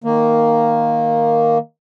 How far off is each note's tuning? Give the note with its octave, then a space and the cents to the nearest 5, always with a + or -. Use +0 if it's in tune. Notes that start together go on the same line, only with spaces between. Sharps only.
D#3 +0 A#3 +0